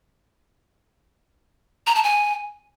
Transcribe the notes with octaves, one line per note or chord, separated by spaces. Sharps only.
A#5
A5
G#5